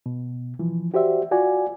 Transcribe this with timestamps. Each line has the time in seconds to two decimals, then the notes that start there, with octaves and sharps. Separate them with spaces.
0.06 B2
0.59 E3 F3
0.94 F#4 G4 C5 D5 E5
1.31 F4 F#4 D5 G#5